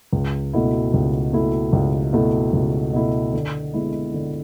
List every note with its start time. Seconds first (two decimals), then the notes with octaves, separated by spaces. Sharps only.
0.13 C#2
0.53 B2 A3 E4
0.94 C#2
1.33 B2 A3 E4
1.73 C#2
2.13 B2 A3 E4
2.53 C#2
2.93 B2 A3 E4
3.33 D3
3.74 G#3 B3 E4
4.14 D3